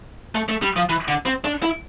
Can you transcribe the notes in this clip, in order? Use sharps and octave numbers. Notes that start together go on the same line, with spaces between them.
A3
A3
G3
F3
E3
D3
C4
D4
E4